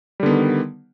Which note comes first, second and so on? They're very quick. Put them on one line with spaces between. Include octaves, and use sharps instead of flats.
G3 D3 B3 D#3